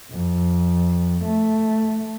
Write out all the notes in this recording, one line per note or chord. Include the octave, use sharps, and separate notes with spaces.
F2
A3